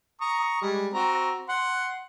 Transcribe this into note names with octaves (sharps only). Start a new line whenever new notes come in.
A#5 C#6 D#6
G3 G#3
C4 F#4 A#5
F#5 C6